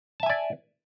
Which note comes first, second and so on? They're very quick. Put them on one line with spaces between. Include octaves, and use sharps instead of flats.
A5 E5 G#5 D5